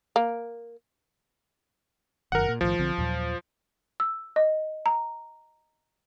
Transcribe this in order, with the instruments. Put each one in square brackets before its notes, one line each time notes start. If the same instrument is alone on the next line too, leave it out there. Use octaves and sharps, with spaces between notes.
[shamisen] A#3
[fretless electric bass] F1 F#2 D#3 [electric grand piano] A#4 F#5
[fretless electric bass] A#2
[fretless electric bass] B1 A2 D#3 [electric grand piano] F3
[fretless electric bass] B1 D3 C4
D#2 A#2 F#3
[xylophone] E6
D#5
A#5